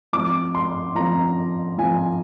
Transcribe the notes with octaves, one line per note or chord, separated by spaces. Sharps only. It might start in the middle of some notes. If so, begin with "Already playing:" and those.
F3 C4 D6
C6
F3 C4 A#5
F3 C4 G#5